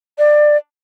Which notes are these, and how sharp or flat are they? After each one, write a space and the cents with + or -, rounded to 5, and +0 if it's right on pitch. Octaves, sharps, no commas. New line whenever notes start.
D5 +20